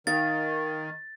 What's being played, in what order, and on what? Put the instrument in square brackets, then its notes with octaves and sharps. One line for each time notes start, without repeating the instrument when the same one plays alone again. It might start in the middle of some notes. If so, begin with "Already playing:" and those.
[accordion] D#3 [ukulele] D#4 A#4 F5 [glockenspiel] A6